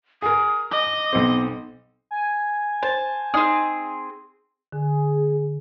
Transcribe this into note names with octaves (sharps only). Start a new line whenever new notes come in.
G#4 A#4 D#6
D#5 D6
B1 B3 C4
G#5
C5 A5
C4 D#4 G#4 D#6
D3 G#4